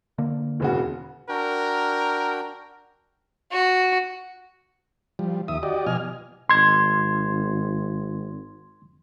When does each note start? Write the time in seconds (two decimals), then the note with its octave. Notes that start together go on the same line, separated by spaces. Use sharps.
0.18 D3 A#3
0.60 E1 C#3 F#4
1.29 D4 F#4 A#4 G5
3.52 F#4
5.19 F3 G3
5.48 D#2 E5 D#6
5.63 F#4 G4 D5 D#5
5.87 B2 F3 D#5 G#5 F6
6.50 G#1 C6 G#6